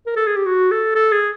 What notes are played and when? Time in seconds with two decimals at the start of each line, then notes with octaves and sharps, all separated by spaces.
0.06 A#4
0.16 A4
0.27 G#4
0.36 G4
0.46 F#4
0.71 A4
0.95 A4
1.12 G#4